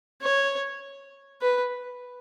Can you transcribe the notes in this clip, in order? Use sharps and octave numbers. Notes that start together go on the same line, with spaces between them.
C#5
B4